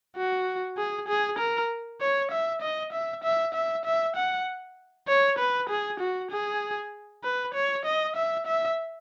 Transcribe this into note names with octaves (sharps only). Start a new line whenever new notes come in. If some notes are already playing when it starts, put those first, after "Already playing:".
F#4
G#4
G#4
A#4
C#5
E5
D#5
E5
E5
E5
E5
F#5
C#5
B4
G#4
F#4
G#4
B4
C#5
D#5
E5
E5